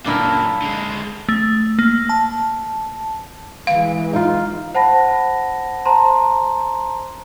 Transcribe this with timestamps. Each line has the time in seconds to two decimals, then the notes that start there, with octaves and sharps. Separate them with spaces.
0.06 F#2 A#2 D4 E4 A#4
0.62 D3 G#3
1.29 A3
1.79 A#3
2.09 A5
3.67 E3 G#3 F5
4.13 D#4 F4
4.75 C5 F#5 A5 B5 A#6
5.85 C5 A5 A#5 C6